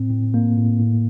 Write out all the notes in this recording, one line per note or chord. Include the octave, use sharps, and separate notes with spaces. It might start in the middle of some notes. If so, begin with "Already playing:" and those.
Already playing: A2 C4
A2
A2 A#3
A2
A2